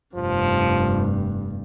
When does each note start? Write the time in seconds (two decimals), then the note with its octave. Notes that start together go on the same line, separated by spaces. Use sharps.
0.15 F1 G2 F3